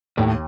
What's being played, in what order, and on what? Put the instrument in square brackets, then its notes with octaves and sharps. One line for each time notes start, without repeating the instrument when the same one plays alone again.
[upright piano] D#2 [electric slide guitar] A2